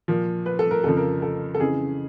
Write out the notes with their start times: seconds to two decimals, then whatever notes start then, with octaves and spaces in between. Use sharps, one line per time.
0.08 A#2 F3
0.46 B4
0.59 A4
0.71 A#4
0.84 F2 C#3 F3 A4
0.97 A#4
1.22 A4
1.55 A4
1.60 F2 C#3 E3 G#4